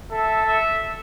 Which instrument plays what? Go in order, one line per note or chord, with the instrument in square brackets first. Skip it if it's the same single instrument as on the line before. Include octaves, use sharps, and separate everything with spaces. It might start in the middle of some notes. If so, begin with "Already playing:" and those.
[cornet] A4 [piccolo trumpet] E5
[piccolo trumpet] E5